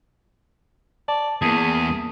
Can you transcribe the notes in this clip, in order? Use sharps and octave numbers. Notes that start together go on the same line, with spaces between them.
D5 A5
E2 A#3 G#4 A5